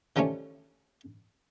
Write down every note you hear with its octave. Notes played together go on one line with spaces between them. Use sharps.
D#3 F3 G3 A3 C#4